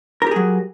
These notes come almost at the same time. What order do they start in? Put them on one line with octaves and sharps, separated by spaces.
A#4 G4 G#4 F#3